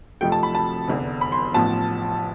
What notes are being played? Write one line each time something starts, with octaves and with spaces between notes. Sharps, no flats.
F2 C3 F3 A3 G5
A5
B5
A5
F1 E2 D3
B5
C6
A1 A2 F3 B3 A5